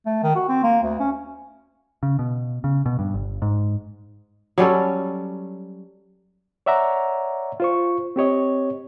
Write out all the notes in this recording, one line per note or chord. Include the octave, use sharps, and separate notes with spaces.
A3
D#3
F#4
C4
A#3
D2
C#4
C#3
B2
C#3
B2
G2
G1
G#2
F#3 G3 C#4 A4
C#5 D5 E5 F#5 A#5
F4 C5 C#6
C4 G4 C#5 D#5